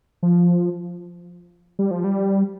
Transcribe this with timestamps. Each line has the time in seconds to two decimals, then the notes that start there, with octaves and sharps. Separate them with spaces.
0.23 F3
1.79 G3
1.91 F3
2.04 G3